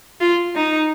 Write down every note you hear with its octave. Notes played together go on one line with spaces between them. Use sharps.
F4
D#4